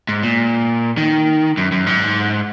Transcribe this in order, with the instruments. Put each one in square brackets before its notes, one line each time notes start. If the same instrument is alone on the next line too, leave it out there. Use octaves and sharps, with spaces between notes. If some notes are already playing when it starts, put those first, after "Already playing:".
[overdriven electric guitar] G#2
A#2
D#3
F#2
F#2
G#2